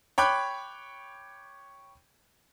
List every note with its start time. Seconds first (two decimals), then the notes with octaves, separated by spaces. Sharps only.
0.18 C#5 G5 B5 D6 F#6